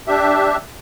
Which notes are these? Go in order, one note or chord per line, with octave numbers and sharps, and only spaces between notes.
D4 G4 E5